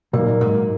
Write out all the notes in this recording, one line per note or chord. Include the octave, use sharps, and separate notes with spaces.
A#2 F#3 A#3 D#4
G#2